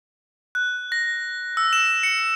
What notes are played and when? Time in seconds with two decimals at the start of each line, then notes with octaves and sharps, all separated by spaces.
0.55 F#6
0.92 A#6
1.57 E6
1.73 E7
2.03 C#7